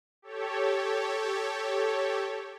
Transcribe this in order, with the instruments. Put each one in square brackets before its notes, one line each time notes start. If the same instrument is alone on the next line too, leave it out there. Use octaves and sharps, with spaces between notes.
[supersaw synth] G4 A4 C#5